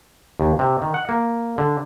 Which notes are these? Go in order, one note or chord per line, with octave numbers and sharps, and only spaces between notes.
D#2
C3
D#3
F#5
A#3
D3